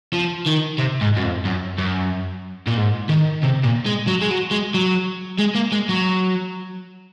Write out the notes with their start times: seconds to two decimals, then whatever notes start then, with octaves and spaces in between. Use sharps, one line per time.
0.14 F3
0.47 D#3
0.78 C3
1.01 G#2
1.16 F#2
1.23 F2
1.45 F#2
1.78 F#2
2.67 A#2
2.77 G#2
3.09 D#3
3.43 C3
3.63 A#2
3.86 G#3
4.07 F#3
4.21 G#3
4.30 F#3
4.51 G#3
4.74 F#3
5.39 G#3
5.55 A#3
5.72 G#3
5.89 F#3